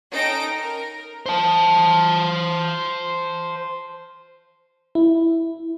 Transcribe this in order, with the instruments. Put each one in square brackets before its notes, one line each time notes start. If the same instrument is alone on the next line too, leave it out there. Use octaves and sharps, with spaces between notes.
[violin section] C#4 D#4 A4 G5 A#6 D7
A#4
[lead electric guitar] C5 A5
[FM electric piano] E4